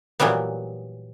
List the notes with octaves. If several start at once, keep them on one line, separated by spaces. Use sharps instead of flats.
A#2 E3 F#3 G3 B3